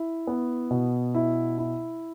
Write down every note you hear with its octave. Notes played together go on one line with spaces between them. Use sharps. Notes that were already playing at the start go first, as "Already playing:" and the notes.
Already playing: E4
B3
B2
E4
E4